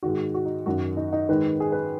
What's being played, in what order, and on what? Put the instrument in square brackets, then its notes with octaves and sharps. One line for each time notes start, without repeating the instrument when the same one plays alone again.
[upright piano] G#2 D#3 F#4
F#4
D#4
F#2 D#3 F#4
D#4
D#4
G#2 D#3 B4
G#4
B4